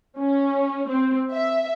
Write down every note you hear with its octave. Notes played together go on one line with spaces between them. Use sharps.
C#4
C4
E5